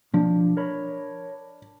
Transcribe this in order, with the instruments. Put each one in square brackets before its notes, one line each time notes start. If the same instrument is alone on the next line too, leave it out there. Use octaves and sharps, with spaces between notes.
[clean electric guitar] B1 F3 [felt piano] D4
[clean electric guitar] A#4 C#5 B5